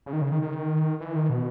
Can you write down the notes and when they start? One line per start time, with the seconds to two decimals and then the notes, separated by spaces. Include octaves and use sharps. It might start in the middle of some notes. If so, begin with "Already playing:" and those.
0.06 C#3
0.13 D#3
0.22 C#3
0.32 D#3
0.42 D#3
1.00 E3
1.16 D#3
1.30 B2